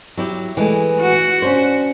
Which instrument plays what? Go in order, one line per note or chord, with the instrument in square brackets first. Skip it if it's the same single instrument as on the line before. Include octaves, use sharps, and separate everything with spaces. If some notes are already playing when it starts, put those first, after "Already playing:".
[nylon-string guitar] F#3 E4 G4
E3 G#3 A3
[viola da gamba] F#4
[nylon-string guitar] C#4 D4 C5